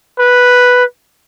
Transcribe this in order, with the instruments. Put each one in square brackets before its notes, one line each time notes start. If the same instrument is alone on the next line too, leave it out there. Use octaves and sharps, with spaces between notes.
[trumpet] B4